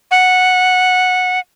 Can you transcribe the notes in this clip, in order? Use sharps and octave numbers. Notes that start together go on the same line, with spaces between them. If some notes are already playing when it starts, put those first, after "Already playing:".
F#5